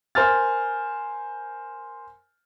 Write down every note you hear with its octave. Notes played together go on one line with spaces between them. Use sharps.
A#4 C5 G#5 F6 A6